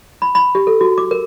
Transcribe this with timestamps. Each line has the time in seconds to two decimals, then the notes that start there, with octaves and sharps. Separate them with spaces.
0.22 B5
0.35 B5
0.55 G4
0.67 A4
0.81 F#4
0.98 D6
1.11 A#4